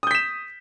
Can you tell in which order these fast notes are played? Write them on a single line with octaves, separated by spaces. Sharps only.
D#6 G6 B6 E7